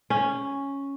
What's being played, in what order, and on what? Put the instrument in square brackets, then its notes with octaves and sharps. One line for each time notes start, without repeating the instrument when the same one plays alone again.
[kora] C#4